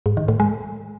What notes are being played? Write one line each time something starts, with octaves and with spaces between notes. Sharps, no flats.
G#2
D#3
A2
G#3